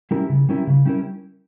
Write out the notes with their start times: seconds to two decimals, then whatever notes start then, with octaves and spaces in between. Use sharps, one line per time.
0.11 G3 C#4 E4 A#4
0.29 C#3
0.49 G3 C#4 E4 A#4
0.67 C#3
0.86 G3 C#4 E4 A#4